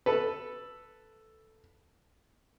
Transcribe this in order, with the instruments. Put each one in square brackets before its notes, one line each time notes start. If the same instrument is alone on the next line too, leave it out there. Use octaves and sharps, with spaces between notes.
[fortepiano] A4 B4